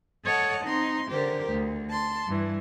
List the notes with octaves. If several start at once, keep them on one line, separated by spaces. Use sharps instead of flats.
A4 C#5 D#5 F#5 A5
C4 D#4 C6
D3 G4 A#4 C5
D2
A5 C6
G2 E3